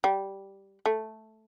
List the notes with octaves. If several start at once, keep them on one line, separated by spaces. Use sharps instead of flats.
G3
A3